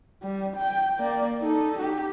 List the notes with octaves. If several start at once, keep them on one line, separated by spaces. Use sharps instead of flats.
G3
G5
A#3 D5
D#4 A4
G4